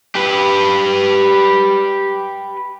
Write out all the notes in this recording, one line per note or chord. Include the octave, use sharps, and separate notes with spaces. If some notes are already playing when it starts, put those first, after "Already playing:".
G4 B4